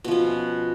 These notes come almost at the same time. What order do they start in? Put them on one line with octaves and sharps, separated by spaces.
B2 F3 C#4